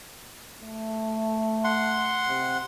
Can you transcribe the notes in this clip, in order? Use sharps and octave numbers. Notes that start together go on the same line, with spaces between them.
A3
F#5 C6
C3